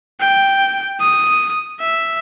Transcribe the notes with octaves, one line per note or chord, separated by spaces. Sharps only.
G5
D#6
E5